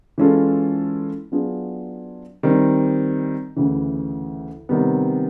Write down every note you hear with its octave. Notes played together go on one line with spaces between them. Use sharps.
E3 G#3 C#4 F4 A4
F#3 B3 D4 F4 G#4
D#3 G3 C4
D2 C#3 E3
C3 D#3 G3 B3